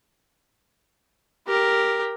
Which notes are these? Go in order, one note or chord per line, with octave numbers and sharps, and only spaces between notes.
G4 A#4